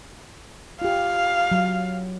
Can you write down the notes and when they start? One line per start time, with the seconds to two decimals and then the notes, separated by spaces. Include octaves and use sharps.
0.82 F4 G4 F5
1.51 F#3